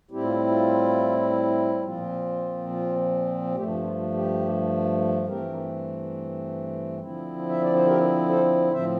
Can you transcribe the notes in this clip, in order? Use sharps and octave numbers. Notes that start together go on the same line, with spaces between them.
A2 G3 C4 E4 G4
F4
F4
A#2 F3 C4 F4
F4
G2 F3 A3 G4
F4
G4
G2 E3 A3 C4 G4 A#4
D3 F3 C4 E4
E5
D5
C5
G4 A#4
A4 C5
A2 F3 C4 C5 E5